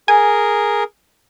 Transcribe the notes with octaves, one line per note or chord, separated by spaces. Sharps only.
G#4 A#4 G#5